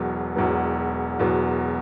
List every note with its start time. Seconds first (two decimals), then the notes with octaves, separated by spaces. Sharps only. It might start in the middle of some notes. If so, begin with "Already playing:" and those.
Already playing: E1 E2 B2 F#3 B3
0.36 E1 E2 B2 F#3 B3
1.19 E1 E2 B2 F#3 B3